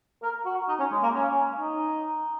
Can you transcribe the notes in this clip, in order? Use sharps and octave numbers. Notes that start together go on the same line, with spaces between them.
A#4
F#4
D#4
C#4
G#3
A#3
C#4
D#4